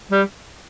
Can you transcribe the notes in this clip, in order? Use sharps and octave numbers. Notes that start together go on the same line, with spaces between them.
G3